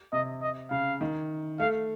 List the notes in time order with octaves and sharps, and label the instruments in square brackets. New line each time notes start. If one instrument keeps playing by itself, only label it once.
[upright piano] C3 [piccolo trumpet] D#5
[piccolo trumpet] D#5
[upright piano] C#3 [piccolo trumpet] F5
[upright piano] D#3
[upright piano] A3 [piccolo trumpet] F5